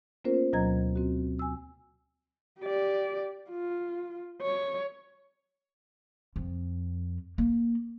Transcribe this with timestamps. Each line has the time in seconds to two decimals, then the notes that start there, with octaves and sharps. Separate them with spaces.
0.24 A#3 B3 C#4 F4 A#4 C5
0.53 D2 B2 F#3 D#5 A#5 G#6
0.96 C4 F#4
1.39 G#5 E6
2.60 G4 D5
3.50 F4
4.42 C#5
6.36 F2
7.38 A#3